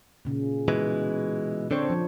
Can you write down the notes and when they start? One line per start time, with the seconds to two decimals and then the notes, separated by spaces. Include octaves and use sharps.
0.25 A#2 C#3
0.68 B2 E3 G#3
1.71 D3 C4 D4 C5 C#5
1.90 F3